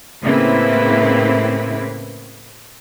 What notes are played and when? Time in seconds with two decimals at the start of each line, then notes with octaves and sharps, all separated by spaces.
0.22 A2 C#3 A#3 C4 E4 B4